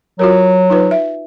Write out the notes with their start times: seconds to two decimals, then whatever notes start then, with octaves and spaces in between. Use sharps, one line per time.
0.19 F#3 F4 F#4 A#4
0.70 D#4 F4 B4
0.91 E5